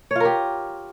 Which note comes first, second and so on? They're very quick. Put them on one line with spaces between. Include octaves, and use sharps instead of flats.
C#5 F4 A#4 G4